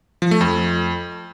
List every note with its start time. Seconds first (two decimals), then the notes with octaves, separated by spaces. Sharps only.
0.22 F3
0.31 A3
0.41 F2